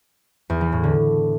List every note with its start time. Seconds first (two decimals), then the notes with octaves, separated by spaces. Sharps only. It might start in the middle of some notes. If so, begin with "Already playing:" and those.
0.50 E2
0.61 E3
0.72 A2
0.84 D3